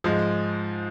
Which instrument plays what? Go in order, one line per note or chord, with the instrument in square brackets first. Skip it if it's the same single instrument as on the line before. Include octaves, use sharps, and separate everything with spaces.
[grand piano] G#2 F3 G#3